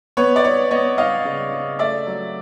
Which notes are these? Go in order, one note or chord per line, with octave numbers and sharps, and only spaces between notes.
B3 B4 C#5
D5
D#4 B4 C#5
B3 C#5 D#5
D#4 D#5 F5
C#3
C#3
A3 D5 E5
F#3